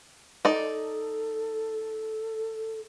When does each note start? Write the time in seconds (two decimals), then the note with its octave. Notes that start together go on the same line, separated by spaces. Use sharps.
0.45 D#4 A4 D5